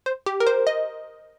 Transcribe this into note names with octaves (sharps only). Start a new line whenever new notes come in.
C5
G4
A#4
C5
D#5